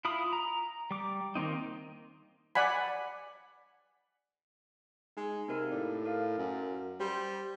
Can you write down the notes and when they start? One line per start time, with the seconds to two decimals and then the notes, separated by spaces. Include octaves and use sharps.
0.05 E4 F4 B5 D#6
0.33 A#5
0.91 G3 D6
1.35 D#3 A#3 C4 D#4
2.55 D5 F#5 G#5 B5
5.17 G#3 D#4
5.48 C3 A#3 D#4 A#4
5.72 A2 G4 D5
6.06 A#4 F5
6.38 F#2
7.00 G3 C5 C6